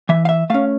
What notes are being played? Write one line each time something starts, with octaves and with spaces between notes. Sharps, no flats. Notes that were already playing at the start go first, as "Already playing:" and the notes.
E3 E5
F5
E5
A3 C#4 F5